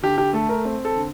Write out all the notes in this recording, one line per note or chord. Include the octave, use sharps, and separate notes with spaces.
D3 G4
G4
A3 A4
A#4
C4
A4
D3